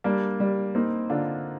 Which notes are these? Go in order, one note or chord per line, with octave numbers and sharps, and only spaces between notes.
G3 A#3 D4
G3
A#3 C4 D#4
D3 D4 F4